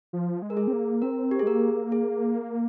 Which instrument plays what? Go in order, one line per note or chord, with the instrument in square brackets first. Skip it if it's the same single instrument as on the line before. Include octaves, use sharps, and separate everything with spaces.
[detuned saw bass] F3
G#3
[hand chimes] A#4
G#4
[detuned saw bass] C4
A#3
[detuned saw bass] C4 [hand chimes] A#4
[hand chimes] G4
G#4
[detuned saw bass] G#3
[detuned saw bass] A#3 [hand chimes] A#4
[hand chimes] G#4